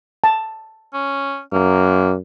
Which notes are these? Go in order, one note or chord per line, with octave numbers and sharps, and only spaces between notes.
A5
C#4
F#2 A#3